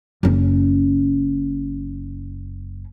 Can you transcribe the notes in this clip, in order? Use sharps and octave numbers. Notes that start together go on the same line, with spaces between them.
F#1 C#4